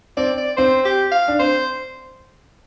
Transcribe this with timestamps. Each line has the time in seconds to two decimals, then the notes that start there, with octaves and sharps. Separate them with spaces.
0.17 C4 D5
0.38 D5
0.57 C4 C5
0.85 G4
1.12 F5
1.28 D4
1.39 C4 C5